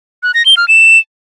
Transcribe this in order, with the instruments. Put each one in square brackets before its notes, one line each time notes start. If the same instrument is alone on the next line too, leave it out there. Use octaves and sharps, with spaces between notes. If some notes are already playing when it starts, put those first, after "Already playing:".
[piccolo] F#6
A#6
G7
F6
E7